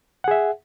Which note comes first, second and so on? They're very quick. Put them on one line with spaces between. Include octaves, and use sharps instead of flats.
F#5 G#4 E5